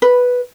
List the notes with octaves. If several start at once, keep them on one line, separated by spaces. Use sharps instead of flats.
B4